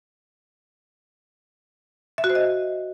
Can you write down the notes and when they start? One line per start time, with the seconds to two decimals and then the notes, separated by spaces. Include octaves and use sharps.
2.18 E5
2.24 F#4
2.30 C5
2.35 D#5